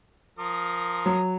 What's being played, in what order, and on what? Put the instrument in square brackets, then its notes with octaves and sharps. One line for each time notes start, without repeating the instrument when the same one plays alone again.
[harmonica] F3 A#4 D#6
[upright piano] F#3